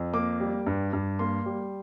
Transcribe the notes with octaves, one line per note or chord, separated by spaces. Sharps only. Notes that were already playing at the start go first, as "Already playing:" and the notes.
Already playing: F2
A#3 D6
G3
G2
G2
A#3 C6
G3